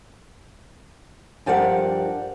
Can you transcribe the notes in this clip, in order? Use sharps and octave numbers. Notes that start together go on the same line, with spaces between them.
G2 F3 G4 A#4 F#5